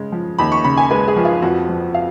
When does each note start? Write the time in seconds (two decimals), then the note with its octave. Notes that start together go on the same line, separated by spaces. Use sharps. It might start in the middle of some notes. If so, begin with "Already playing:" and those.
Already playing: C#3 G#3
0.12 F3
0.38 D#2 B5
0.52 C#6
0.64 C#3 B5
0.77 G#5
0.91 G#3 B4
1.08 G#4
1.16 F3
1.25 F4
1.42 F2 F#4
1.69 F3
1.94 F5